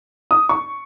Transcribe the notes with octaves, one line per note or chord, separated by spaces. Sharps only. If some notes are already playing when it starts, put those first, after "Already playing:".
D#6
C#6